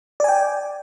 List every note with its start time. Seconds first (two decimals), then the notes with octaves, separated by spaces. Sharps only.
0.20 D5
0.24 G#5
0.28 G5